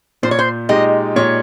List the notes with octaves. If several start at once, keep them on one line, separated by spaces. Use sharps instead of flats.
A#2 C5
C#5
C5
G#3 D#4 G4 D#5
A#2 C#5